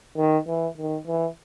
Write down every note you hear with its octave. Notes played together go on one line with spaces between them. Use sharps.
D#3
E3
D#3
E3